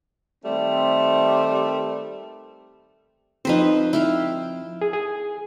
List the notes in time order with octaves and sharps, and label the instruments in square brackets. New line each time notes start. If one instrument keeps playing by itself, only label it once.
[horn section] D#3 G3 A3 C4
[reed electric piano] F3 C4 [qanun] D#4 B4 C5
[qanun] E4 F5 G5
[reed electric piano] G#4
G#4